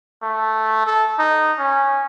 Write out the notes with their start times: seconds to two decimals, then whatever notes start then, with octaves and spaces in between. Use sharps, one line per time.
0.22 A3
0.86 A4
1.19 D#4
1.59 C#4